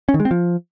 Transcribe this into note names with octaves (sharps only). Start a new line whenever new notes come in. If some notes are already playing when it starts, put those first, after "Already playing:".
C#4
D#3
G#3
C4
F3